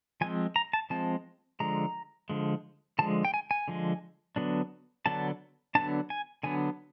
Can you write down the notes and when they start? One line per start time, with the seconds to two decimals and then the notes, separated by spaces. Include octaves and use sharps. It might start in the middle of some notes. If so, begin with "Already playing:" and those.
0.21 F3 G#3 C4 G#5
0.56 A#5
0.73 A5
0.90 F3 G#3 C4 A5
1.60 D3 F3 G#3 A#5
2.30 D3 F3 G#3
2.99 D3 F3 G#3 A5
3.25 G5
3.34 G#5
3.51 G#5
3.68 D3 F3 G#3
4.36 D3 F#3 B3 D4
5.06 D3 F#3 B3 D4 A5
5.75 D3 F#3 B3 D4 A5
6.10 G#5
6.43 D3 F#3 B3 D4 G#5